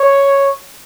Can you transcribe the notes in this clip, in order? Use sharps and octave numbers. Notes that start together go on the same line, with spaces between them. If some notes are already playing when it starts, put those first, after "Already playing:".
Already playing: C#5